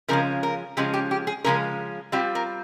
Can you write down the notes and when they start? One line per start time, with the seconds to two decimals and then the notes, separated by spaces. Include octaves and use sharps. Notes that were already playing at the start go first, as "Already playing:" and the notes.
0.08 C#3 F3 G#3 C#4 A#4
0.43 A#4
0.77 C#3 F3 G#3 C#4 G4
0.94 G4
1.11 G4
1.27 G#4
1.44 C#3 F3 G#3 C#4 A#4
2.12 G3 C4 F4 G4
2.35 A#4